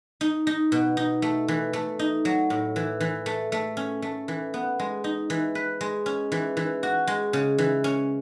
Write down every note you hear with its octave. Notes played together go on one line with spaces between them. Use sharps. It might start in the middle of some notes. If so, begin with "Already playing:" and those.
D#4
D#4
B2
D#4
A3
E3
A3
D#4
F#3
A2
E3
E3
A3
A3
C#4
A3
E3
B3
G#3
D#4
E3
B4
G#3
C#4
E3
E3
F#4
G#3
C#3
E3
C#4